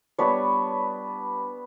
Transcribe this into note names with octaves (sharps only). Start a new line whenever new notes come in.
G3 B3 D4 B4 C#5